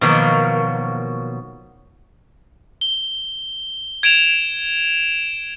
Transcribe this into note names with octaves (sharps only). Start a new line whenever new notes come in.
B2 D#3 F3 F#3 A#3
G7
G#6 D7 E7 F7